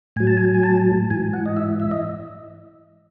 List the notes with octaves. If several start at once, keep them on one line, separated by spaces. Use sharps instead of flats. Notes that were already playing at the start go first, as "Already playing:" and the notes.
A2 F#3 G#5
A5
G#5
G#5
A5
G#2 E3 G#5
F#5
D#5
E5
E5
D#5